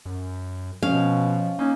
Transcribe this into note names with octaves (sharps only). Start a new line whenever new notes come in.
F#2
B2 F3 C#4 F5
A#3 C#4 D#4